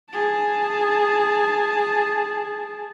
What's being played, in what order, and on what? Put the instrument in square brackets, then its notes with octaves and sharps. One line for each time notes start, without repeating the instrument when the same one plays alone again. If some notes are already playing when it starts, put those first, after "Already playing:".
[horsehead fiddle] G#4 A5